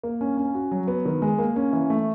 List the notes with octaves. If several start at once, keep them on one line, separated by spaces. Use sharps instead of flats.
A#3
C#4
C#4
F#4
F#3
B3
D#3
G#3
A#3
C#4
E3
A3